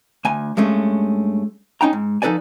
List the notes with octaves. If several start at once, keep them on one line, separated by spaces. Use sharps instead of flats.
D2 G#5
G2 G#3 A3 C#4
C#4 D#4 G5 A#5
G#2
F3 D#4 A4 B4 D5 G#5